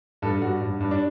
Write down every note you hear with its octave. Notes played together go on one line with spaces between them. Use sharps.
G2 A4
G2 F#4
G2
G2
D4